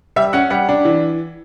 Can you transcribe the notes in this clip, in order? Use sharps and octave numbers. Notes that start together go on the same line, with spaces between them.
G3 E5
C#4 F#5
G3 F#5
D4
E3